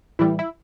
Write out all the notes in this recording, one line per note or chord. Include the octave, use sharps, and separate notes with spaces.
A2 E3 G3 E4
E4